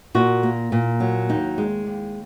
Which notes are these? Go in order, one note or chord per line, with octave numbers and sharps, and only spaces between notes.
A#2 F#4
A#3
A#2
F#3
D#2 D#4
G#3
D#2